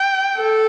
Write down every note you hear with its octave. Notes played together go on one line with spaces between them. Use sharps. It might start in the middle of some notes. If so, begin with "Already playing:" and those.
Already playing: G5
A4